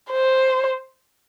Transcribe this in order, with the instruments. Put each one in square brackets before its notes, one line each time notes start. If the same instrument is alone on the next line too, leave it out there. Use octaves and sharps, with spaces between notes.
[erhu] C5